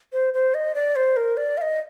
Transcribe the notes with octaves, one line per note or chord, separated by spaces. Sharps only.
C5
C5
D#5
D5
C5
A#4
D5
F5
D#5